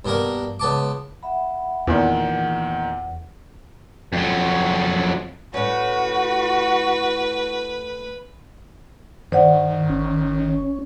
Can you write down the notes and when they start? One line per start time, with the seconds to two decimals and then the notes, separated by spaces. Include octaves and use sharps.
0.05 G2 B2 A#3 A#4
0.60 C#2 B3 A5 D6
1.23 E5 F#5 B5
1.87 E2 A#2 D#3 F#5
4.13 F2 F#3
5.54 A2 C#4 F#4 B4
9.32 G2 D#3 C5 D5 F#5
9.90 G#1 C#4